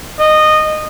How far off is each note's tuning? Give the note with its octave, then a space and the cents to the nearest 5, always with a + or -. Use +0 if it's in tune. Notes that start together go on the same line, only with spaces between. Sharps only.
D#5 -15